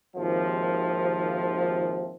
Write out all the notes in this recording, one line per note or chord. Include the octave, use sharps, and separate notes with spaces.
G#1 D#2 C3 F3